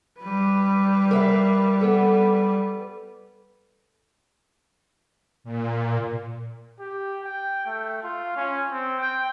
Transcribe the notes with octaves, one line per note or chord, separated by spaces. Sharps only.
G3 B4
A#4 E5 F5
B3 A4
A#2
G4
G5
A3
F4
C#4
C4
G5